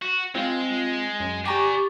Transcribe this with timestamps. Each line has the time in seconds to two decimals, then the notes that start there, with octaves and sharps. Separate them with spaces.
0.02 F#4
0.35 G#3 C4 F4
1.20 F#2
1.46 G4 D5 G5 G#5 A#5 C#6 D6 A6